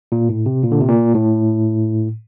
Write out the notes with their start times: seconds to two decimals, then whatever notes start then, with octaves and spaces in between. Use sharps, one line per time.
0.12 A#2
0.29 A2
0.46 C3
0.64 A#2
0.72 D3
0.80 C3
0.89 A#2
1.14 A2